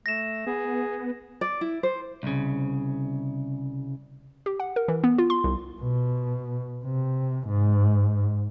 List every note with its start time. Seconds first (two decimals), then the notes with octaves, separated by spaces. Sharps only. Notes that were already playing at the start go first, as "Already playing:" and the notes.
0.06 A3 A#6 E7
0.47 B3 G#4
1.41 D5
1.61 E4
1.83 C5
2.23 C2 C#3
4.46 G4
4.60 F#5
4.76 A#4
4.88 E3
5.04 B3
5.18 F4
5.30 C6
5.44 C2
5.81 B2
6.85 C3
7.48 G#2